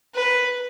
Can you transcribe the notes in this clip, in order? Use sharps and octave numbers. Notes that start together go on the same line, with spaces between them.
B4